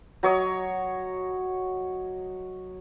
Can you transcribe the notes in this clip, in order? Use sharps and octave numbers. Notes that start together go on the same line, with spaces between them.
F#3 C#5 D#5